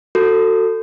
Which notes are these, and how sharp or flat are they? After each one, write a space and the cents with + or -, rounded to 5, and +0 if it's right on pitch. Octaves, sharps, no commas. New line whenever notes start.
F#4 +0 A4 +25